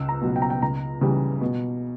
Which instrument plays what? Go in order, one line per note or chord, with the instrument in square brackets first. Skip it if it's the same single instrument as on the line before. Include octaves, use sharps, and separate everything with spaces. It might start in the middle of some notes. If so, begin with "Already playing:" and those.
Already playing: [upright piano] C#2 E6
A#5
B2 F#3
G5
A#5
G5
C#2 A#5
C#3 E3 G3
B2